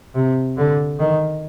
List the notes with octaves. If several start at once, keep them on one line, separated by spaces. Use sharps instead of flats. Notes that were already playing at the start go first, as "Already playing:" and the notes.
C3
D3
D#3